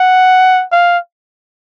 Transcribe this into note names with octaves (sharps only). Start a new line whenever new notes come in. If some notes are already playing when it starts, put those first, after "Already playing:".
Already playing: F#5
F5